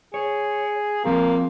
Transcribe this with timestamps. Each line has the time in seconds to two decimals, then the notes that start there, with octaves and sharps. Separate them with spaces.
0.14 G#4 C#5
1.05 F3 A#3 C4 G#4